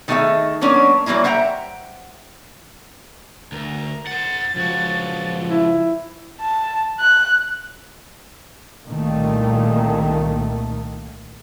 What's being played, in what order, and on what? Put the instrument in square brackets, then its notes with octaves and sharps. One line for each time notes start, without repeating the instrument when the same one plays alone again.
[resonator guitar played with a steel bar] D#3 A3 D#4 E4 G#4 E5
F#3 A#3 B3 C#4 D4
E3 F#3 G3 A#3 E4
C5 E5 F#5 G5 A#5
[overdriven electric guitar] D2 [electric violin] A#4
[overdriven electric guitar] C5 F#5 [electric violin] A6
[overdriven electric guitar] C#2 F#4 [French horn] F3
[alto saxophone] E4
[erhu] A5
F#6
[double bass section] C2 A#2 D#3 A3 A#3